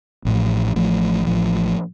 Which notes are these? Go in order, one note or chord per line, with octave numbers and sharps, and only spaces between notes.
A1 A2 F3
A1 A2 F3
A1 A2 F3